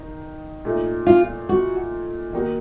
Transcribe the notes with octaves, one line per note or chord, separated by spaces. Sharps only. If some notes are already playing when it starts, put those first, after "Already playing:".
Already playing: D#3 D#4
A#2 A3 D#4
F4
F#4
D#3 A#3 D#4 F#4